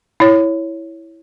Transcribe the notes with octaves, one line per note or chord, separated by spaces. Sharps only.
E4 C#5